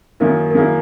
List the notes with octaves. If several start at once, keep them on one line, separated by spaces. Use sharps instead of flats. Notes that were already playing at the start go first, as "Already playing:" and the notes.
F#2 D#3 A#3 E4 A#4
A#4
F#2 D#3 A#3 E4 G#4